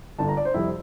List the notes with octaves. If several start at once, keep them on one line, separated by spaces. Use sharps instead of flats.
G1 G2 D3 A5
A#5
D5
C5
F2 C3 G3 E4